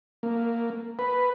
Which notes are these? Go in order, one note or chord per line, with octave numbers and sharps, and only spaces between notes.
A#3
B4